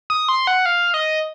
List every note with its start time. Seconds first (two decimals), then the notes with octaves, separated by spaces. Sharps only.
0.10 D#6
0.29 C6
0.47 F#5
0.66 F5
0.94 D#5